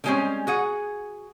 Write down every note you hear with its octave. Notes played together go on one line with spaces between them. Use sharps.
D3 G3 G#3 A#3 C4 C#4
F#4 G#4 F#5